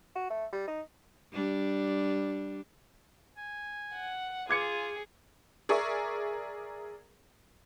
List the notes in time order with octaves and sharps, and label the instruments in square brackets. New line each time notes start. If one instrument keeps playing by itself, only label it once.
[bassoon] F#4
A3
G3
D#4
[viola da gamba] G3 D4
[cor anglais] G#5
[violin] F#5
[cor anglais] F4 [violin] G#4 [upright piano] D6 G#6 C#7
[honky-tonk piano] G#4 A#4 D5 E5 C#6